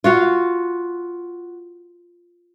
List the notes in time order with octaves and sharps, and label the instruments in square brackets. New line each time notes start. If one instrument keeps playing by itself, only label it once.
[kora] F4 F#4 F5